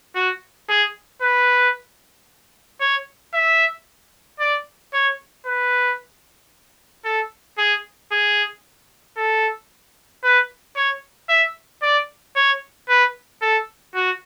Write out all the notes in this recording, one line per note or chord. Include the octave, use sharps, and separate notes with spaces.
F#4
G#4
B4
C#5
E5
D5
C#5
B4
A4
G#4
G#4
A4
B4
C#5
E5
D5
C#5
B4
A4
F#4